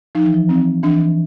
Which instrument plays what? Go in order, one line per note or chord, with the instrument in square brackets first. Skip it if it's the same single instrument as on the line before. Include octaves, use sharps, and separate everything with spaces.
[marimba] F3 [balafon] D#4
[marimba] E3
F3
[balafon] C4
[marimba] E3 [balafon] D4